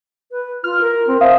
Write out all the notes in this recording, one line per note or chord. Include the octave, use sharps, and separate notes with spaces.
B4
F4 F6
A#4
C4
C5 E5 F5 D#6